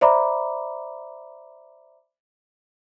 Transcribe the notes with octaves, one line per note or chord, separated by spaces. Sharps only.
C5 D5 E5 A#5 B5 D6